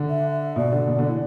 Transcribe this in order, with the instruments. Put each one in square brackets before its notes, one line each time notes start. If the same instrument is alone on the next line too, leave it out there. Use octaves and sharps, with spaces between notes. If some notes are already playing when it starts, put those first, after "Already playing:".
Already playing: [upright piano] D3
[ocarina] E5
[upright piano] B2 [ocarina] D5
[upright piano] D3
B2
D3
E3